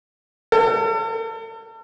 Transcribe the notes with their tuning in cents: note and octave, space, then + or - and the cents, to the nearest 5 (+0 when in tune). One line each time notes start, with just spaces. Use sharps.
A4 +40